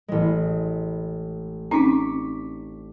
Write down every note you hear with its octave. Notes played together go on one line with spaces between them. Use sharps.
A1 G#3
C4 C#4 D#4 C#6 D6 B6